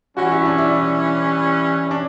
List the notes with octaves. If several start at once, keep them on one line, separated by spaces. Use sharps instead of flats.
E3 G3 C#4 F#4
E4
D4
E4
D4